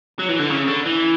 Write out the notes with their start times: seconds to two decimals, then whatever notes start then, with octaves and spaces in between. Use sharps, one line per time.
0.19 F#3
0.29 E3
0.39 D3
0.50 C#3
0.68 D3
0.86 E3